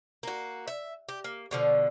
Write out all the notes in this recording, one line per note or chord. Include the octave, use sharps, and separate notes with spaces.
A#3 F#4
E5
G4
A#3
B2 D3 F3